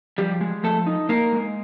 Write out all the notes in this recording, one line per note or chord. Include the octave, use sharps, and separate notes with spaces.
F3 G3 G4
G#3
F3 A3 A4
D#4
A#3 D#4 A#4
G#3